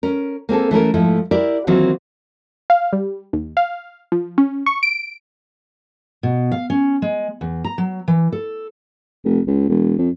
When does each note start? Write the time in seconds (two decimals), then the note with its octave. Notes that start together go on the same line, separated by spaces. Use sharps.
0.03 C#4 A#4
0.49 A#3 C4 G#4 A4
0.71 E3 A3 C#4 A#4
0.94 G#2 F3 A3 E4
1.31 E4 G4 A#4 D5
1.67 D#3 E3 F#3 A#3 C4 F4
2.70 F5
2.93 G3
3.33 D#2
3.57 F5
4.12 F3
4.38 C#4
4.66 C#6
4.83 D7
6.23 B2
6.51 F5
6.70 C#4
7.02 G#3
7.41 E2
7.64 A#5
7.78 F#3
8.08 E3
8.32 A4
9.25 F1
9.47 C#2
9.69 E1
9.98 F2